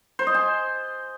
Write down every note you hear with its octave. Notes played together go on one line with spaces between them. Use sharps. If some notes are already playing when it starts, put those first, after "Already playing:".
C5
D#5
G#5